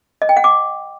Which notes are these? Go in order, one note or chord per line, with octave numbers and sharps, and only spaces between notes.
D#5
G5
F#5
D6